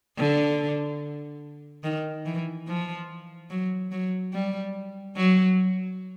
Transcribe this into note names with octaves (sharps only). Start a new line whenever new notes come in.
D3
D#3
E3
F3
F#3
F#3
G3
F#3